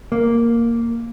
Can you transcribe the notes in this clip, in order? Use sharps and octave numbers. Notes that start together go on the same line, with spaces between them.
A#3